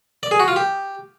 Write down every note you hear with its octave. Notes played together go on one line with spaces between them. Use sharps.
D5
G#4
F#4
F4
G4